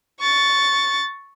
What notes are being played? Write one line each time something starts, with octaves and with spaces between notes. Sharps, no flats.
C#6 A6